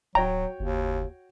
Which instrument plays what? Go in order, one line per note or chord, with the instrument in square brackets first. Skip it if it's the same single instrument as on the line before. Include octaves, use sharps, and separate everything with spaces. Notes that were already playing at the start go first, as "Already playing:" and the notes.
[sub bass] D1 [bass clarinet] F#3 [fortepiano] F#4 C#5 G5 [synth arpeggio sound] A#5
[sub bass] F#1 [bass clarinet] D#2